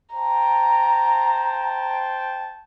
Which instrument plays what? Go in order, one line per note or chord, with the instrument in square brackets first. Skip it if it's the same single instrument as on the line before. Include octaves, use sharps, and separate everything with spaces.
[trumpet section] C5 G5 A5 [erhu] A#5